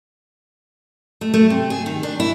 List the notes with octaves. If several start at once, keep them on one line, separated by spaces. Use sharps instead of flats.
A3
A3
C3
G#4
D#3
D4
E4